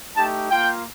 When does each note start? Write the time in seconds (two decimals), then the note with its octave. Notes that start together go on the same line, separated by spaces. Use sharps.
0.16 A3 D#4 G4 A5
0.49 A#3 F4 G5